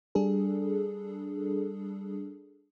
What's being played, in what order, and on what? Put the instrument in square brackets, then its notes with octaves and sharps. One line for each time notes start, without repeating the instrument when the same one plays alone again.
[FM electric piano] G3 D4 G#4 A4